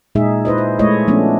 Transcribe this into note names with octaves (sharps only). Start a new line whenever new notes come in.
A#2 G#3 D#4 G#4 E5
E4 B4 C5 D#5
C5
G#3 A3 E4 C#5 D#5
F3 A3 B3 C#4 D4